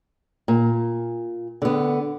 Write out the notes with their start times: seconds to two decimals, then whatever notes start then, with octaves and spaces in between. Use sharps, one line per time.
0.48 A#2
1.62 D3 B3